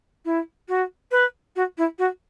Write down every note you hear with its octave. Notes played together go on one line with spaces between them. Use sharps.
E4
F#4
B4
F#4
E4
F#4